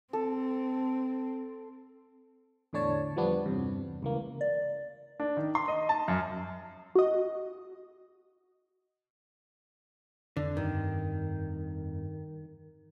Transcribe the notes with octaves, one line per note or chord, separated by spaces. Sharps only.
C4 A4
E2 A2 D3 D4 C#5 A5
F3 G3 B3 D4
E2 G2 C3
C#2 E3 A#3
D5
D4
D#3
C6
D#5
A5
F#2
F#4 D#5
F2 D3
G2 D#3